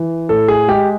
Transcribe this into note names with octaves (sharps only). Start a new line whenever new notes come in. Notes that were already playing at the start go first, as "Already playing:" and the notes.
Already playing: E3
A2 A4
G#4
G#3 G4